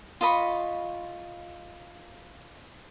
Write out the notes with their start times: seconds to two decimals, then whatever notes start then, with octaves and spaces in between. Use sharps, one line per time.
0.21 F4 D#5 B5 C#6